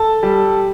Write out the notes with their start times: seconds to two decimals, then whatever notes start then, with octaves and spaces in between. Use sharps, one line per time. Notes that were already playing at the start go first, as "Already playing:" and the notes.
Already playing: A4 A5
0.23 G3